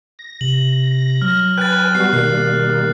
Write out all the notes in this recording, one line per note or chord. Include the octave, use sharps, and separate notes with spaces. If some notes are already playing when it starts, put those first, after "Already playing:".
A#6
C3 F#7
F#3 F6
B4 G5 G#5 F#6 A6
G3 B3 F#4 C7
B2 D#3 G3 A#3 F#6 C7